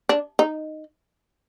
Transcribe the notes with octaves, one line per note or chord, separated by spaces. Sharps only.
D4
D#4